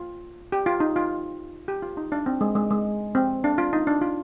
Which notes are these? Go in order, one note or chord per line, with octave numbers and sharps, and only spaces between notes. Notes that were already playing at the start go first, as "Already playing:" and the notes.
Already playing: F4
G4
F4
D#4
F4
G4
F4
D#4
D4
C4
G#3
G#3
G#3
C4
D4
F4
D#4
D4
F4